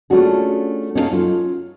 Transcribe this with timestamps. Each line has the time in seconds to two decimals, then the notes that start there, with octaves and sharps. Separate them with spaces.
0.10 A3 C#4 D4 F4 F#4 G#4
0.95 C#4 D#4 E4 A4 F5
1.11 F#3 F4